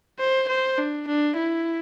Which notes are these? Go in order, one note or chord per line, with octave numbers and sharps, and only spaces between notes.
C5
C5
D4
D4
E4